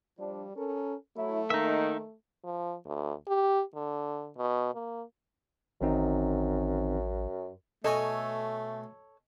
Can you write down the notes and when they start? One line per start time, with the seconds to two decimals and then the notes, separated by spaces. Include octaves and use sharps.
0.19 F3 G3 D4
0.56 C#4 A4 A#4
1.17 F#3 A3 E4
1.50 D#3 A#3 D#4 E5
2.44 F3
2.86 D2
3.28 G4
3.75 D3
4.37 B2
4.74 A#3
5.81 A1 F#2 D#3 C4 D#4
7.84 B2 A3 A4 C#5 D#5 G#5